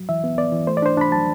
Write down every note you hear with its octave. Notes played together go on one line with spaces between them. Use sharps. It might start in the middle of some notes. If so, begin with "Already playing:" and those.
Already playing: F#3
E3 E5
B3
B3 D5
E3
A3 C5
D5
D4 C5
D4 B5
F#3 A5